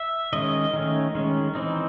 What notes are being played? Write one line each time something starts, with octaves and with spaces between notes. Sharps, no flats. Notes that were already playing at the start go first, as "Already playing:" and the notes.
Already playing: E5
D#3 G#3 C#4 D#5
D#3 A3 C#4
D#3 G#3 C#4
E3 C4 D#4